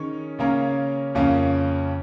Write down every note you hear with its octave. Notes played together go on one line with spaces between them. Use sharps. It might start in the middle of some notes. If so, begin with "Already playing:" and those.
Already playing: D#3 C#4 G#4 C#5
C#3 A#3 C#4 A#4 C#5
F2 C#3 A#3 C#4